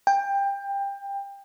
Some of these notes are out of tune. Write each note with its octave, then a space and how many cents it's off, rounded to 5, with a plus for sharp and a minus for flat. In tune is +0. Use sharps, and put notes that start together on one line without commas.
G5 +20